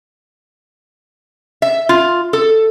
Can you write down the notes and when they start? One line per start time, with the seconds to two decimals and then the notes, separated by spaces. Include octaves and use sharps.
1.62 E5
1.89 F4
2.33 A4